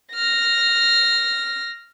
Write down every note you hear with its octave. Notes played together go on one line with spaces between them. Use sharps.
F6 A#6